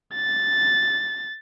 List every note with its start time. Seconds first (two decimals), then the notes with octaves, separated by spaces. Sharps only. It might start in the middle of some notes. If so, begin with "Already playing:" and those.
0.15 A6